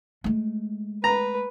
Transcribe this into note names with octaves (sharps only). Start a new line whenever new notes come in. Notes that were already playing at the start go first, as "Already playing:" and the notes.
G#3 A3
B4 A#5